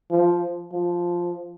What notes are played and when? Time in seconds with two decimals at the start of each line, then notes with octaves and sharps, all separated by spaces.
0.11 F3
0.72 F3